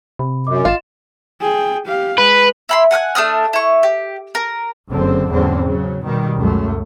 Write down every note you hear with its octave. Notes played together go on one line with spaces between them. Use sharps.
C3 B5
F#2 D#5 D6
G#1 F4 D#5 A6 E7
G#4 G5
G4 F5
G#3 B4
E4 B5 C6
F#5 G#5 F6 F#6
A3 D4 D#6 F6
E4 C#6
G4
A#4
F#1 D3 C4
E2 G#2 D3 F#3 C4 C#4
C#3 F#3
B2 D#3 G3
C#2 F#2 A3